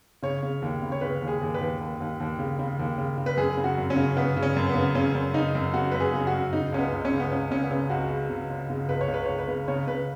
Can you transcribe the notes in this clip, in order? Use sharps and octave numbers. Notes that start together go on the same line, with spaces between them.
C#3 C#5
C#3
D#2
C#3
C#5
C#3 B4
D#2
G#4
D#2
B4
D#2
D#2
D#2
D#2
C#3
C#3
D#2
C#3
C#3
B4
F#2 G#4
C#3
F#4
F#2
C#4
C#3
C#3 B3
C#3
C#4
F#2
B3
C#3
C#3 C#4
F#2
C#3 D#4
F#2
C#3 F#4
F#2 B4
G#4
C#3
F#4
F#2
C#3 D#4
C#2 C#4
B3
C#2
C#4
C#3
B3
C#2 C#4
C#3 C#4
B3
C#3 C#4
C#2 F#4
C#3
C#3
C#3
C#3
C#2 B4
C#5
C#2
B4
C#2 C#5
B4
C#3
C#3 C#5
C#3 B4